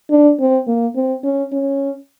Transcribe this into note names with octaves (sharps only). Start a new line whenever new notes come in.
D4
C4
A#3
C4
C#4
C#4